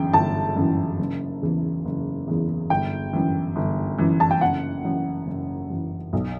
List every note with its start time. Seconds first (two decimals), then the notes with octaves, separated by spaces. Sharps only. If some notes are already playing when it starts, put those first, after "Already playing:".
Already playing: G1 F#2 C#3 E3 G5
0.13 G1 A5
0.56 F#2 C#3 E3
0.99 F#1
1.41 E2 C#3 E3
1.85 F#1
2.27 E2 C#3 E3
2.70 G1 G5
3.13 F#2 E3
3.56 G1
3.98 F#2 E3
4.20 A5
4.31 G5
4.41 F#1 F#5
4.84 F#2 E3
5.27 F#1
5.70 F#2 E3
6.13 B1